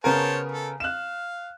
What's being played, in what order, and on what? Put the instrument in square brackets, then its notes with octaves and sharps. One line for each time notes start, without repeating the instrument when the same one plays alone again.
[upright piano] C#3 B3 A#4 [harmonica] C5 C#5 A5
[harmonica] A4
[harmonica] F5 [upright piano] F#6 E7